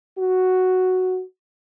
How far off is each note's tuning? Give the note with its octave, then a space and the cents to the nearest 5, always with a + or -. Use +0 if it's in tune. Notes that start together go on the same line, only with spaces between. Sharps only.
F#4 +0